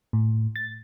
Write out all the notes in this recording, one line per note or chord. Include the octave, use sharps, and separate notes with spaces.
A2
A6